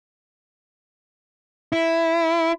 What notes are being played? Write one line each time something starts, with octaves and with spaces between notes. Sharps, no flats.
E4